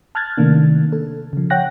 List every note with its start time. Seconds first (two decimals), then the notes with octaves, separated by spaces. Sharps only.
0.15 A5 F6 F#6 G#6 A6
0.38 C3 D#3 A3 A#3 D4
0.93 A4
1.33 C#3 F3
1.50 C#5 F#5 G5 F#6 A#6